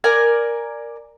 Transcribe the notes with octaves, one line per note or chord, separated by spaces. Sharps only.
A#4 D5 G#5 A#5